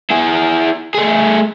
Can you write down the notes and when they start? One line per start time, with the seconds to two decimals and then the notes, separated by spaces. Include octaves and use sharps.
0.11 E4 G#4
0.95 A3 G#4